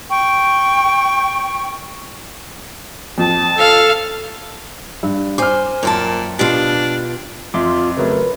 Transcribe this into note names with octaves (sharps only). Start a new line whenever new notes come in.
G5 C#6
F2 A5
A4 F5
G2
C5 G#5 D6 F6
F#2 A#2 G5 A5
B2 D4 F4 G4
F2 F4 E5 C6 D6
C#3 F#3 A3 A#4 B4